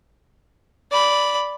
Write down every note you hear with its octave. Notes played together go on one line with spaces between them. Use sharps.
D5 B5